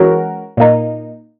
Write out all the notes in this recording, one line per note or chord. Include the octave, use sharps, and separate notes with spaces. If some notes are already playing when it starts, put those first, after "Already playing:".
Already playing: E3 G#3 C#4 F#4 A#4
A#2 A#3 D#4